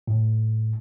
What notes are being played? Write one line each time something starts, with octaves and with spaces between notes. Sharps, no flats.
A2